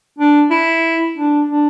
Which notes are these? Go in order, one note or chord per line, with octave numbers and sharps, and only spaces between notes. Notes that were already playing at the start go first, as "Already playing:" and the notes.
D4
E4
D4
D4